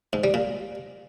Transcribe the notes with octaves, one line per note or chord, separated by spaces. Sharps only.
G#2
G3
A#2